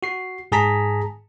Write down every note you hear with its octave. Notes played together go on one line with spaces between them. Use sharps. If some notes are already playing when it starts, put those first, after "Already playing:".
F#4 C7
G#2 G#4 A5 A#5 B6